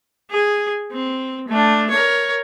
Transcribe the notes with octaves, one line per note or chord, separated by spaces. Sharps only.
G#4
C4
A3 D4
A#4 C#5